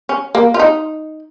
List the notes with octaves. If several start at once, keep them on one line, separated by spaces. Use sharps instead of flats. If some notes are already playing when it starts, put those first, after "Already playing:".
C#4
A#3
F4
D#4